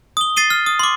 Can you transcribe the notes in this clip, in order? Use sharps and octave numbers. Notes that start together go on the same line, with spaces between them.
D#6 G7
A6 C7 D#7 G7
F6
D#6
C6 D6